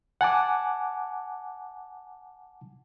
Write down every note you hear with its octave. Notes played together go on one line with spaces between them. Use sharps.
F#5 G#5 A5 D6